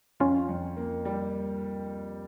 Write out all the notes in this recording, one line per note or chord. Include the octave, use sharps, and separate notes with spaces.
F2 C#4 F4
F2
A#3
G3